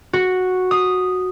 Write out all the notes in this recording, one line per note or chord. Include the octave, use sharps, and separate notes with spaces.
F#4
D#6